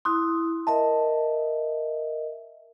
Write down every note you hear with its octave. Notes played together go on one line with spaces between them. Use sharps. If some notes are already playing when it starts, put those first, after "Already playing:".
E4 C6 D#6 F#6
A#4 D#5 E5 A5